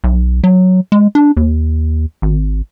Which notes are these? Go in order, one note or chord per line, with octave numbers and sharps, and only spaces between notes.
B1
F#3
G#3
D4
D#2
G#1